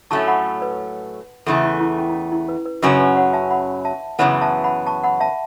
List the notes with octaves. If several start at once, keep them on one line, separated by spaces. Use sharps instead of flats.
A2 F#3 A3 C#4 A5 C#6
F#5 B5
B4
E2 C#3 E3 A3 A4
E4
E4
C#4
E4
C#4
E4
B4
B4
F#2 C#3 F#3 C#4 B4
B4 E5
C#5 F#5
E5 A5
F#5 B5
E5 A5
F#2 C#3 E3 B3 C#5 F#5
E5 A5
F#5 B5
A5 C#6
F#5 B5
E5 A5